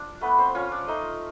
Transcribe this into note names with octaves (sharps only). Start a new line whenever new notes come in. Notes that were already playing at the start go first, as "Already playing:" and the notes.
Already playing: D4 F4
A3 B3 B4
C4 C5
C#4 F4 C#5
D4 D5
A3 D#4 D#5